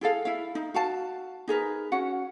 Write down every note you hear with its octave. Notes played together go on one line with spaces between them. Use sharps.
E4 G#4 A4 F5
E4 F5
D#4
F#4 F5 A5
D#4 G#4 A#4 B4
C#4 F#4 F#5